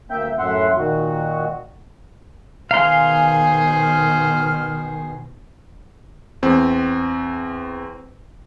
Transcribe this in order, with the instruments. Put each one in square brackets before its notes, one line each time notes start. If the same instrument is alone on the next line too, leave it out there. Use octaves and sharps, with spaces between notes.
[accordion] D2 A#3 E5 G5 G6
F#2 A2 E5 F#5 C6
A#2 D#3 F#4
[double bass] B2 D#3 [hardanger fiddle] G#4 C5 [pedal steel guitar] F5 A#5 C6 [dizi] G#5
[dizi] F6
[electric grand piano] E2 C4